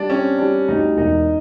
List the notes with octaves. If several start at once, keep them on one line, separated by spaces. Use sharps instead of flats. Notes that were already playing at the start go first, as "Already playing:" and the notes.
Already playing: G3 D4
C4 C#4
G3 D4
D2 D#4
E1 D#4